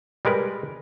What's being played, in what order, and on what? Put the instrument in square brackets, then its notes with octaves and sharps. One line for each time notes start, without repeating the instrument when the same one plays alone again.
[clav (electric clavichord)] G3 G#3 A#4 B4